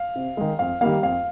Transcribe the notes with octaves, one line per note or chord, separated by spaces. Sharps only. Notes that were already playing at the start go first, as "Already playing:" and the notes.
Already playing: F5
C3
D#3 G#3
F2 F5
D#3 G3 A#3 F5
F2 F5